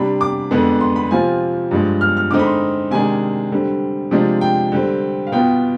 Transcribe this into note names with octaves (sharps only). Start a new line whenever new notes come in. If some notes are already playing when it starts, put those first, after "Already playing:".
Already playing: C3 G3 D4 B5
D6
F2 D3 G#3 B3 D4
C6
B5
C3 F3 C4 F4 G#5
G2 F3 G#3
F6
F6
D3 G#3 C4 D#4 D6
B5
C6
C3 D#3 G#3 D4 G#5
D3 G3 C4
C3 F3 G#3 D4
G5
D3 G3 C4
F5
B2 B3 F4 G5